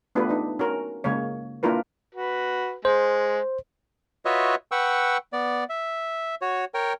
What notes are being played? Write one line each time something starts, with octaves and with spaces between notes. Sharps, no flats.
A3 B3 D4 F4 G4 B4
D4 D#4
C#4 F#4 A#4
C#3 G#3 A#3 C#5
A#3 D4 E4 F4 A#4 B4
F#4 B4
G#3 C5
F4 F#4 B4 C#5 D#5 E5
B4 F#5 G5 C#6 E6
B3 D5
E5
F#4 C#5
A#4 C#5 G5